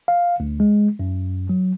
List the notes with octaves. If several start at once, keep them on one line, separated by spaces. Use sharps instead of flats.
F5
D2
G#3
F#2
F#3